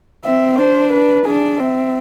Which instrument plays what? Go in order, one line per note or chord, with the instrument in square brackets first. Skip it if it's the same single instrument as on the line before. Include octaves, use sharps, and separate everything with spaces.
[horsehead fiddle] C4 [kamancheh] E5
[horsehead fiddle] D4 [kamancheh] C5
[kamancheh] B4
[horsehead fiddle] D4 [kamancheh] G#4
[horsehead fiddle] C4 [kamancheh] E5